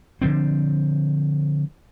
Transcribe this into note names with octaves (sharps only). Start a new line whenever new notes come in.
D3 F3 C4